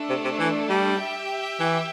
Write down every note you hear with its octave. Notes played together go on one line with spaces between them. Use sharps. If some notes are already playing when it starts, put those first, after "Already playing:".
Already playing: A3 D4 A4
C3
C3
E3
G3
G4 E5 G5
E3